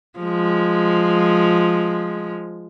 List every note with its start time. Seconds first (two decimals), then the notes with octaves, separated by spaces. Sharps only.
0.19 F3 G#3